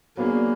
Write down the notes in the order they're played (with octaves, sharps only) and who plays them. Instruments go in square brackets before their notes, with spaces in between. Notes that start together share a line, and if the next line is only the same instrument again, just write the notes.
[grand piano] F#3 B3 D4 G#4 [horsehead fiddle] A#3